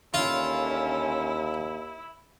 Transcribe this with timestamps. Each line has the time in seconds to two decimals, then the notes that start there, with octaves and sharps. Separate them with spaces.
0.14 D#2 D3 C#4 E4 F4